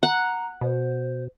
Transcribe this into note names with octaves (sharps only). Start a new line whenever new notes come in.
F#5 A#5
B2 C5